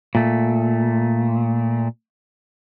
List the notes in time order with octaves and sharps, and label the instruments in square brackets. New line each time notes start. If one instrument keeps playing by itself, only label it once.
[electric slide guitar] A#2 A3